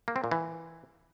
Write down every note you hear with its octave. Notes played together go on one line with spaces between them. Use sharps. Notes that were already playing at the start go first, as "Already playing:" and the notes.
A#3
C4
A#2
E3